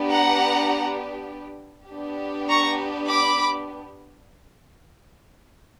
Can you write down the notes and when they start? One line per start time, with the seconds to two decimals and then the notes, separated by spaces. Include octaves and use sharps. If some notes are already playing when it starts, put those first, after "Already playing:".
Already playing: B3 D4 G4
0.11 F#5 A#5
1.89 B3 D4 G4
2.48 A#5 C#6
3.07 B5 D6